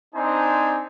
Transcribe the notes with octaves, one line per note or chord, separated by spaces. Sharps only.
C4 D4 D#4 C5 G#5